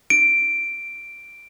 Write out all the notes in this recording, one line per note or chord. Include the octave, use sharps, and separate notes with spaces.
D7